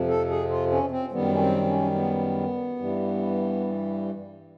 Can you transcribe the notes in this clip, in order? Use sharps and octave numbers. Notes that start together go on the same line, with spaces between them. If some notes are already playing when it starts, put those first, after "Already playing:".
Already playing: F2 C3 F3
A4
G#4
F4
C#4
C4
F#2 D#3 G3 B3
C#4
C4
C4
C#4
B3
G2 E3 G3